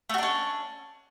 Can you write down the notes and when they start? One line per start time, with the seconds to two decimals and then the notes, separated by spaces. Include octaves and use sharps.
0.09 A3
0.14 F#4
0.18 D4
0.23 C#4